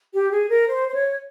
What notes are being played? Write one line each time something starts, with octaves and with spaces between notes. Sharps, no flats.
G4
G#4
A#4
C5
C5
C#5